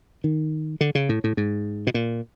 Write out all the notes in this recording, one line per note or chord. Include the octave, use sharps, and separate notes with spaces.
D#3
D3
C#3
A2
A2
G#2
B2
A#2